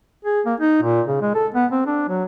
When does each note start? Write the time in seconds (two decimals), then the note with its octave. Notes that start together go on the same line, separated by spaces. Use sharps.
0.25 G#4
0.46 A#3
0.60 D#4
0.82 A#2
1.07 C#3
1.22 G#3
1.34 A4
1.54 B3
1.72 C4
1.87 D4
2.09 F#3